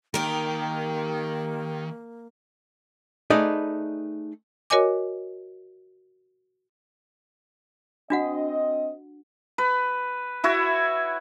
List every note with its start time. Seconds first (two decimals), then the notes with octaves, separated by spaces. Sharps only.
0.14 D#3 A#3 G4 A#4
3.30 A3 D#4 G#4 B4 D5 D#5
4.70 F#4 A#4 C#5 D#5 G#5 D6
8.10 C4 D4 F#4 D#5 F#5
9.58 B4
10.44 E4 F#4 C#5